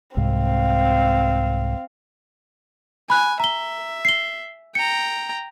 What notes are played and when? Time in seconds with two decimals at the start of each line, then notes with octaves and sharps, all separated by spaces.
0.17 C2 G#2 C4 F5
3.10 G#5 B5 F#6
3.40 E5 A#5 G7
4.05 C7 G7
4.75 G5 A#5 C#7